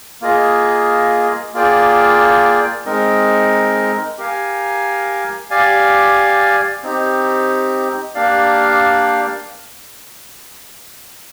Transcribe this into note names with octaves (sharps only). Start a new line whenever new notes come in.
A#3 F4 G#4 D#5
A#3 F4 G#4 D5 G5
G#3 C4 D#4 A#4 D#5
G4 A#4 F5 G#5
G4 D5 F5 G#5
C4 D#4 G4
A#3 D4 G4 D5 F5